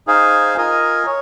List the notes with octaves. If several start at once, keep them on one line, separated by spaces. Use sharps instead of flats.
D#4 G#4 C5 F5 G#5
F4 A#4 D#5 G#5
C#5